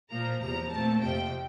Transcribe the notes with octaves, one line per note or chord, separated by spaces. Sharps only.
A#2 F3 A#3 A#5
E2 C3 F3 A#5
A#2 A3 C4 A5
F2 C3 F3 G5